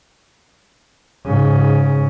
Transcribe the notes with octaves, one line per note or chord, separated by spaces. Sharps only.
G#2 C#3